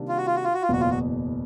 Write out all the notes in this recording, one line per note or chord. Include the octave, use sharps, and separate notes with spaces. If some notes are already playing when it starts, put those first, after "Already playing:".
Already playing: C3 D#3 G3 A#3 D4
F4
F#4
F4
F#4
F4
F#4
F4
F#1 E2 B2 F#4
F4
F#4